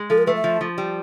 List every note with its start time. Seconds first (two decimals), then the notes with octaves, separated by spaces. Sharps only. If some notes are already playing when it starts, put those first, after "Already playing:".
Already playing: G#3
0.10 F3 A4
0.18 A#4
0.27 A3 B4
0.35 E5
0.44 F3
0.61 F3
0.78 G3